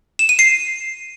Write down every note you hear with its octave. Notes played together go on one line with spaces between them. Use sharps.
E7
D#7
C7